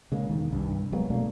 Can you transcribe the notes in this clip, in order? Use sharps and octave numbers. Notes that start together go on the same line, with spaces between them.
C#3 G#3 A#3
E1 D#3
C2 G2
F#3 G#3 A#3 B3
B2 A3 A#3 D4